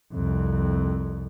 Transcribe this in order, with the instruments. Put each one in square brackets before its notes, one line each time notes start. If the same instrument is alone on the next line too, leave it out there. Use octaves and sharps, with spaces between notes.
[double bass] C2 F2